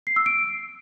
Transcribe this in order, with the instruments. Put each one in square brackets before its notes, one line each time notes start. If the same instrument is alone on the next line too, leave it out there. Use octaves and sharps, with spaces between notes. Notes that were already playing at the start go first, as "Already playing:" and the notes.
[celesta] C7
E6
D7